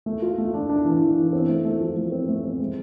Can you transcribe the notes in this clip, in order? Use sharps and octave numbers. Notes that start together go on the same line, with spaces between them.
A3
F4
A3
D4
D4
E3
E3
E3
C4
A3
A3
F3
A3
C4
A3
C4
G#3